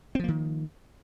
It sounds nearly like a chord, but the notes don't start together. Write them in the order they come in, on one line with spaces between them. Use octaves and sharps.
C4 F3 A#3 D#3